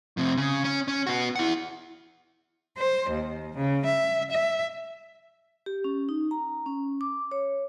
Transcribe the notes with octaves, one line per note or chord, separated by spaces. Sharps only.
F2 C3
C#3
C#4
C#4
B3 F#4
E4 F#5
C5
D#2
C#3
E5
E5
G4
C#4
D#4
A#5
C#4
D6
C#5